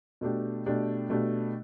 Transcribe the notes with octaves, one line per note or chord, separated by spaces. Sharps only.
B2 A3 D4 G4
B2 A3 D4 G4
B2 A3 D4 G4